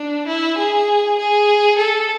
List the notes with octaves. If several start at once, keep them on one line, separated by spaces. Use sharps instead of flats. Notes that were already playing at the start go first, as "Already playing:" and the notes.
Already playing: D4
E4
G#4
G#4
A4